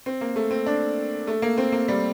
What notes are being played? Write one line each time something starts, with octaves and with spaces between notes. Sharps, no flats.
C4
A#3
A3
C4
D4
A3
A#3
C4
A#3
G3